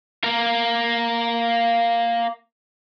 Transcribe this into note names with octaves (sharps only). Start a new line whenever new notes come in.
A#3 A#4